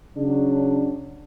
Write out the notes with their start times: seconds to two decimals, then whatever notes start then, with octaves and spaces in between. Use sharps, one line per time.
0.17 C#3 F#3 D4